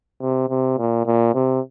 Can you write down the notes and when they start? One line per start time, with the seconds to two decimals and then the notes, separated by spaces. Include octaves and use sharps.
0.22 C3
0.49 C3
0.78 A#2
1.06 A#2
1.34 C3